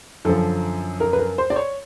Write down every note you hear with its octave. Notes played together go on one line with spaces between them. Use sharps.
F#2 D3 F3 A4
A#4
B4
A#4
C5
D5
C#5